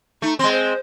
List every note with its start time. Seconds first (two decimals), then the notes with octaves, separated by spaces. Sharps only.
0.22 A3 D#4
0.39 G#3 C4 C6
0.51 C5